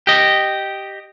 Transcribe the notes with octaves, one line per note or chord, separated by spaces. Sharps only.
G4 D#5